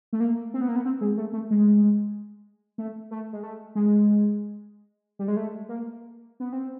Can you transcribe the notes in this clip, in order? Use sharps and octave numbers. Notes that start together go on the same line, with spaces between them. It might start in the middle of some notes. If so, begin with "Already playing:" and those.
A3
A#3
C4
B3
A#3
B3
C4
G#3
A3
A3
G#3
A3
A3
G#3
A3
G#3
G3
G#3
A3
A#3
B3
C4